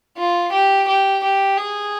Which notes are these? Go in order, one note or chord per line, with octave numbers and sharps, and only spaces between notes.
F4
G4
G4
G4
G#4